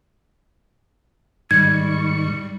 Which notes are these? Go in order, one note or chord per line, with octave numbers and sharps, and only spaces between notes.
G#2 D#3 G3 C#6 G#6